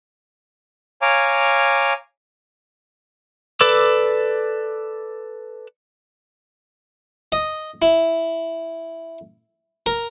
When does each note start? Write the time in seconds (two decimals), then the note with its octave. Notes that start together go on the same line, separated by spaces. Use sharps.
1.02 C#5 F5 G#5 A#5 D6
3.61 A4 B4 D5 D6 E6
7.32 D#5
7.82 E4
9.86 A#4